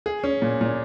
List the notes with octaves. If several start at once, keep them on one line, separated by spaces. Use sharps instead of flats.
G#4
C#4
A#2
A#2